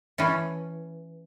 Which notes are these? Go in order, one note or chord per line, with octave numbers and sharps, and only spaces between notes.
E3 A3 C#4